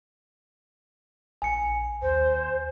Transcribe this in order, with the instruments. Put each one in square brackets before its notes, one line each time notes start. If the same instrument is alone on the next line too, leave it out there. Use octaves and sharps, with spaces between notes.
[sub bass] A#1 [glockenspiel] G#5 C#7
[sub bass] D#2 [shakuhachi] C5